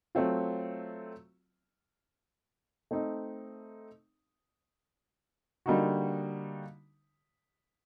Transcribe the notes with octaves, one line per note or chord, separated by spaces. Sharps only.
F#3 A3 C4 F4
A3 C4 D#4
D3 G3 A#3 D#4 F#4